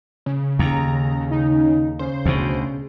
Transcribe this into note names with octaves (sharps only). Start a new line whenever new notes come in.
C#3
D#2 A#5
D#4
C#3 C5
D2 B2